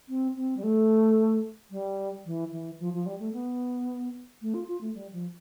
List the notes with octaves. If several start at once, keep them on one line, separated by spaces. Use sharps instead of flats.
C4
C4
G3
A3
G3
E3
E3
F3
F3
G3
A3
B3
A3
F4
F4
A3
G3
F3